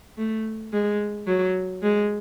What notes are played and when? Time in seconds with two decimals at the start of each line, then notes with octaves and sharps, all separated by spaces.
0.18 A3
0.73 G#3
1.27 F#3
1.83 G#3